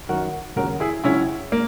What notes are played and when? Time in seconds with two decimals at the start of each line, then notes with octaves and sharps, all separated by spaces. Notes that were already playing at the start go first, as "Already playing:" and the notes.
0.09 F#2 D#3 F#3 F#4 A#4
0.56 D#2 C#3 F#3 F#4 A#4
0.80 E4 G#4
1.04 C#2 C#3 F#3 C#4 E4
1.52 A#3